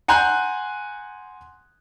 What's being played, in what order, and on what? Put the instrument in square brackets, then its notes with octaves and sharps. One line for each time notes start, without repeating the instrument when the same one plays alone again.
[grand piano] F#5 G#5 A#5 C6 F#6 G6